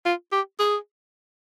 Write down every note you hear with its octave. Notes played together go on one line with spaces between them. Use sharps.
F4
G4
G#4